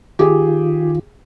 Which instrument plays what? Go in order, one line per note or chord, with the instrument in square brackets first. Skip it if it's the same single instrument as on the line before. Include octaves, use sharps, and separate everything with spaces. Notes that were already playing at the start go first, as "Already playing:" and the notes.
[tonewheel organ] D#3 F4 [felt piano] G4 G#4